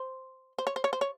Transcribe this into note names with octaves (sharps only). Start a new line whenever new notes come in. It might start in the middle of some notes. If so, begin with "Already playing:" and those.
Already playing: C5
C5
C#5
C5
C#5
C5
C#5